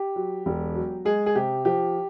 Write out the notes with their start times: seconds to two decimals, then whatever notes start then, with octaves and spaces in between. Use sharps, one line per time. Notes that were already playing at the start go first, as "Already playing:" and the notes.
Already playing: G4
0.16 F#3
0.46 E1
0.75 F#3
1.05 G#3 G#4
1.26 G#4
1.35 C3 G4
1.65 F3 G4